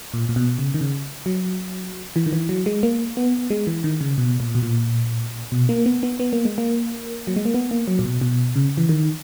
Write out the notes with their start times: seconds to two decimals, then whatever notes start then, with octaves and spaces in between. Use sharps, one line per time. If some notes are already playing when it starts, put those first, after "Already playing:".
0.14 A#2
0.29 A#2
0.36 B2
0.59 C#3
0.74 D#3
0.81 C#3
1.26 F#3
2.16 E3
2.26 D#3
2.33 E3
2.49 F#3
2.66 G#3
2.83 A#3
3.17 B3
3.50 G#3
3.67 E3
3.84 D#3
4.01 C#3
4.18 B2
4.40 A#2
4.55 B2
4.63 A#2
5.52 B2
5.69 A#3
5.86 B3
6.03 B3
6.19 B3
6.33 A#3
6.45 G#3
6.58 A#3
7.27 F#3
7.36 G#3
7.45 A#3
7.54 B3
7.71 A#3
7.88 F#3
7.99 A#2
8.05 B2
8.21 B2
8.55 C#3
8.77 E3
8.89 D#3